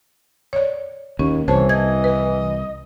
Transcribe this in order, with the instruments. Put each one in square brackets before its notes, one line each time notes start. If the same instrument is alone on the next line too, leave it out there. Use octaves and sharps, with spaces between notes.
[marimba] C#5 D5
[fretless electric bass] D#2 [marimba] C#4
[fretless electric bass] C2 [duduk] E3 [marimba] C5 A5 [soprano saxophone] C#5
[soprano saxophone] D#5 [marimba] G#6
[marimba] B4